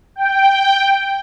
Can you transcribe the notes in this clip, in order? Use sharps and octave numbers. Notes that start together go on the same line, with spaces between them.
G5